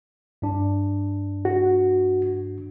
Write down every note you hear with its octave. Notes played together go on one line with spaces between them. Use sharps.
G2 D4
F#4